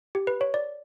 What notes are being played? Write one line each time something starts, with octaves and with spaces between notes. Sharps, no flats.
G4
B4
C#5
D5